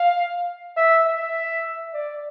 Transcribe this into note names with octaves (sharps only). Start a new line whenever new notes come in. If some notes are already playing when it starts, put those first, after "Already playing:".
Already playing: F5
E5
E5
D5